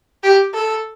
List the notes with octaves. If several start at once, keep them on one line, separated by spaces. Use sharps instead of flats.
G4
A4